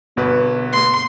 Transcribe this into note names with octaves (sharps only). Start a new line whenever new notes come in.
G1 B2 B3 B4
C6